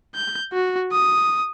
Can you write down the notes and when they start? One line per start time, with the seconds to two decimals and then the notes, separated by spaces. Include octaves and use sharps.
0.15 G6
0.53 F#4
0.92 D#6